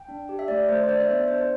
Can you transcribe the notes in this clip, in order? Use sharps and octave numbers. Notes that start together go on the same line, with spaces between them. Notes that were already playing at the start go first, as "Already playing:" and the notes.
Already playing: G5
D4
G4
E5
A3 D5
A3 C5
C5
D4 D5
E5
B3 D5
D4 C5
C5